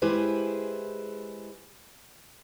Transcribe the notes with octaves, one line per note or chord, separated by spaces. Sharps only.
G#3 E4 G4 G#4 B4 C5